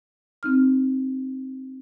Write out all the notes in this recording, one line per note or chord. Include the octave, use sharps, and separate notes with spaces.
C4 D#4 F6